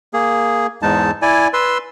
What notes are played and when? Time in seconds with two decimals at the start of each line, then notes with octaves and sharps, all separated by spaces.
0.14 A#3 G#4
0.82 E2 G#2 G#3 D#4 A5
1.22 E4 D5 G#5
1.53 B4 C6 E6